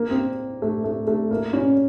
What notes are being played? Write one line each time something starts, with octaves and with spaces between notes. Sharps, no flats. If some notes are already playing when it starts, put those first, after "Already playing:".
Already playing: A#3
C4
A3
A3
A3
A#3
C#4